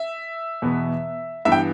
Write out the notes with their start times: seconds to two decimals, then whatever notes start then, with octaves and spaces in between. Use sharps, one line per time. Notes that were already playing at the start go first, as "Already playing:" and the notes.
Already playing: E5
0.62 E2 B2 B3
1.45 G2 E3 B3 E5
1.52 G5